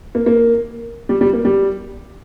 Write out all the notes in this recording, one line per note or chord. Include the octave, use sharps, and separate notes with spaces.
A#3
A#3
G3
G3
A#3
G3